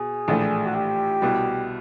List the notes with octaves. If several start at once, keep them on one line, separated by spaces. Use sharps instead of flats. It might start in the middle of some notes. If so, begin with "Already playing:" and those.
Already playing: B2 G#4
A#1 A2 E3 A3 D4
F#4
G4
C2 B2 G3